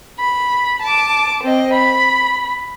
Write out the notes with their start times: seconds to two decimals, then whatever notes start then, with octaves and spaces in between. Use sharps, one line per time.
0.20 B5
0.82 A5 D6
1.43 C4 D#5
1.73 B5